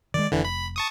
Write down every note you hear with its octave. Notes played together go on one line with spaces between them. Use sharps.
D#3 E3 G#3 D5
F1 D3 E3
B5
A5 C#6 D#6